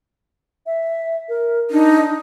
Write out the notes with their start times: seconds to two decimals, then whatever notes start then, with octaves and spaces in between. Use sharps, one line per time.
0.66 E5
1.29 A#4
1.71 D4 D#4